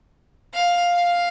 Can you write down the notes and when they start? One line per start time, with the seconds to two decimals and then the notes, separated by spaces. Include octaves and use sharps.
0.54 F5
0.94 F5